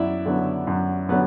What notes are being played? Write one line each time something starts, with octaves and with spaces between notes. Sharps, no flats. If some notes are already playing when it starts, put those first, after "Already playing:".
Already playing: F#2 B3 E4 D5 E5
D3 F#3 B3
F#2
D3 F#3 B3